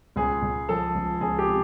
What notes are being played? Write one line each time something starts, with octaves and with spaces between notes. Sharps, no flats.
C#2 G#4
C#2
F3 A4
C#2
C#2 G#4
G4
C3